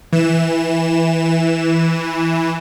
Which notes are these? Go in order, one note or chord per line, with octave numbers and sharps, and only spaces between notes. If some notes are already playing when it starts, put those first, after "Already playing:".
E3 E7